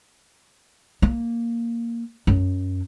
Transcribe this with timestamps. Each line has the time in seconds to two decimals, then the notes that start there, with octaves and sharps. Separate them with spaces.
1.02 A#3
2.27 F#2